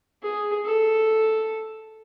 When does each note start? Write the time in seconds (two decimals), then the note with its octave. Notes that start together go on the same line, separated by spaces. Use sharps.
0.23 G#4
0.65 A4